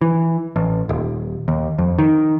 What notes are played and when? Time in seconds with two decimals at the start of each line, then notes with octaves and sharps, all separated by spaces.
0.01 E3
0.56 A1
0.89 D#1
1.48 D#2
1.78 F2
1.99 D#3